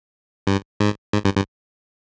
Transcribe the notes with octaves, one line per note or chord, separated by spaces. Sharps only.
G2
G#2
G#2
G2
G2